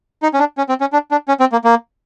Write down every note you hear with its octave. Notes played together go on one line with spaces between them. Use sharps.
D#4
C#4
D4
C#4
C4
C#4
D4
D4
C#4
C4
A#3
A#3